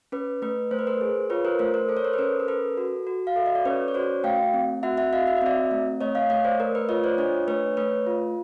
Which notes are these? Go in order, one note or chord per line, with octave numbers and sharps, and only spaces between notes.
C#4 B4
A3 B4
A3 C5
B4
A#4 C5
G#4
F4 B4 C#5
A#4 C5
A3 A#4 C5
A#4 C5
A4 C5
C#5
A#4 C5
B4
C#4 A#4 C5
A#4
A4 B4
F#4
F#4
F5
A4 E5
D#5
D5
C#4 B4 C#5
C#5
F#4 C5 D5
A3 F5 G5
C4
F#4 E5 F#5
E5 F#5
F#4 D#5 F5
E5
D#5
C4 D5 E5
A3
A3 C#5 D#5
D#5 F5
A3 C#5 D#5
C5 D5
A3 A#4
B4
F4 C#5 D#5
C5 D5
D4 C#5 D#5
A3 B4 C#5
A3 B4 C#5
F4